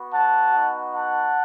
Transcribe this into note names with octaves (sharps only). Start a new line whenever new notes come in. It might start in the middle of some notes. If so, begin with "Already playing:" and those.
Already playing: B3 F#4
F#5 A5
B3 D#4 F#4
F#5 A5